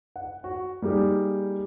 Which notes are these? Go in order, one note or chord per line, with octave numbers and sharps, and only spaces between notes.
F#5
F#4
G3 A#3 D#4 G4 G#4